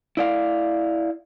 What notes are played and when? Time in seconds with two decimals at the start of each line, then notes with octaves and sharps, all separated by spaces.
0.17 E4 D5 F5